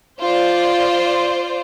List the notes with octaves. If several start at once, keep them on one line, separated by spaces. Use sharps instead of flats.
F4 C5 D5